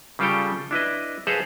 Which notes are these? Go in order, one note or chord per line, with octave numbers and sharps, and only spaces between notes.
C#3 G3 F4 G4 A4 G5
D4 E4 B4 D#5
G#4 A4 B4 C5 D#5 F5